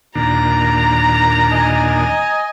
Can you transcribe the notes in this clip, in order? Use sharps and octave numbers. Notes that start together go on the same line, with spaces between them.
D#2 A#2 D4 A#5
D#5 G#5